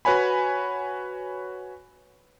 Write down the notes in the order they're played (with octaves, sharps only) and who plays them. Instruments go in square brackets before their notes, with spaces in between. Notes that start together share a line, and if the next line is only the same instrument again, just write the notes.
[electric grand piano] F#4 B4 C#5 G#5 B5